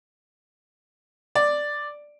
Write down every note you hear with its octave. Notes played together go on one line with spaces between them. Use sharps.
D5